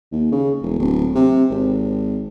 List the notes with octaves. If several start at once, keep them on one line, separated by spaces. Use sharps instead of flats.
D#2
C#3
E1
D1
C3
G#1